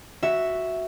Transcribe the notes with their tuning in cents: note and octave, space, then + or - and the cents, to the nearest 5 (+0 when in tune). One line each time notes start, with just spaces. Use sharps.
F#4 +0 E5 +0